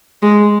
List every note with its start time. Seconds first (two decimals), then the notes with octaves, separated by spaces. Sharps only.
0.22 G#3